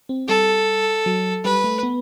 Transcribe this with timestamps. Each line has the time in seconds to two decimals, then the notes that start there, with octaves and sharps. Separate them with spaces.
0.09 C4
0.28 G3 A4
1.06 F#3
1.45 G3 B4
1.64 A3
1.83 B3